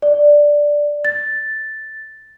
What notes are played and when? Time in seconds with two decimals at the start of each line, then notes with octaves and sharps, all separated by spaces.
0.02 D5
1.05 A6